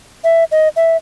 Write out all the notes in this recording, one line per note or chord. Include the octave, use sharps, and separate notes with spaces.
E5
D#5
E5